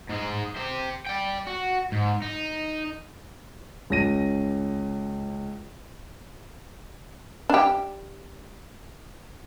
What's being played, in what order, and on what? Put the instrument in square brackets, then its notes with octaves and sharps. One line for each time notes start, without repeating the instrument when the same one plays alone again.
[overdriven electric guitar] G#2 G#3
G4 C5
D5 G5
F#4
G#2
D#4
[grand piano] C#2 C#4 A#6 D#7
[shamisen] D4 G4